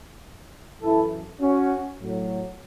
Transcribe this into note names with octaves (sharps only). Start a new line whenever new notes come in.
F#2 E3 E4 A4
C#4 F#4
A2 F#3